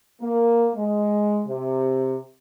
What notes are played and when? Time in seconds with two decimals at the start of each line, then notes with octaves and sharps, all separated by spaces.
0.21 A#3
0.75 G#3
1.46 C3